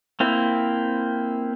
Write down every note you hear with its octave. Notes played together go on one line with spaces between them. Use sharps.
A#3 C4 E4